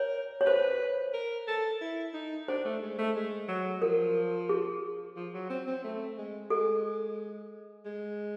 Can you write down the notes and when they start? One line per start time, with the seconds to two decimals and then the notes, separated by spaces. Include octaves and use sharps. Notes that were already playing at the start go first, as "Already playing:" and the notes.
Already playing: A#4 C#5
0.41 C#5
0.46 B4 C5
1.14 A#4
1.48 A4
1.81 E4
2.14 D#4
2.48 D4 C5
2.65 A3
2.82 G#3
2.98 A3
3.16 G#3
3.49 F#3
3.82 F3 A#4
4.49 G#4
5.16 F3
5.34 F#3
5.50 C4
5.67 C4
5.84 A3
6.18 G#3
6.50 G#3 A4
7.86 G#3